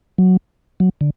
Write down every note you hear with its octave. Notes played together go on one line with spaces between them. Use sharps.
F#3
F#3
D3